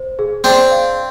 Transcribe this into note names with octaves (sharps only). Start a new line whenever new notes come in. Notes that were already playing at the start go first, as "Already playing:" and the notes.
Already playing: C5
G#4
C4 D4 G#4
F5